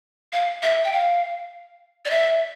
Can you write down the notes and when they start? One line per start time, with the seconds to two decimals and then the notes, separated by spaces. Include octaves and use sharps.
0.33 F5
0.63 E5
0.85 G5
0.92 F5
2.05 D5
2.10 E5